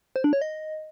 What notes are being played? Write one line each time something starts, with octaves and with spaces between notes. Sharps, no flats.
C5
D4
C#5
D#5